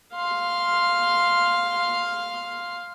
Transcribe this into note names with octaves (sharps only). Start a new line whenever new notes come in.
F5 C6